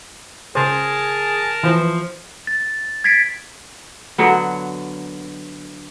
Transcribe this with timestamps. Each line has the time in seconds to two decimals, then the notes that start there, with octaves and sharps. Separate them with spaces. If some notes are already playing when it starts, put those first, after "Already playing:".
0.55 C#3 G#4 A#4 C5 A5
1.63 E3 F3
2.47 A6
3.04 G#6 A6 B6 C7 D7
4.18 D3 F#3 B3